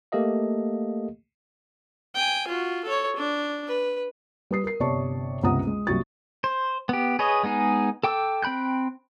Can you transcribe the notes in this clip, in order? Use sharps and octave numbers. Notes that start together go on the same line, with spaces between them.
A3 A#3 G4 A4 D#5 F5
G5 G#5
F4 F#4
A4 C#5
D4
B4
G3 B4 D#6 C7
A#4 C7
G1 C3 C#5 D5 A5 C#6
G1 C#2 C3 F#5 A#5 D#6
G#3
C2 A#2 F#3 F#4 C#6 A6
C5
B3 G4
G#4 B4 C#5 D#5
G#3 B3 D#4 G#4
A4 G5 D6 E6
C4 G5 B5 F#6 G6